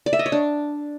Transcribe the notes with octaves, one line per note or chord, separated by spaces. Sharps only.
D5
E5
D#5
C#5
D4